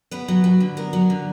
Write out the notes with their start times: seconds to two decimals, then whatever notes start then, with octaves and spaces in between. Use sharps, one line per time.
0.11 B3 B4
0.28 F#3
0.44 F#3
0.60 D3
0.77 B3 A#4
0.93 F#3
1.10 D3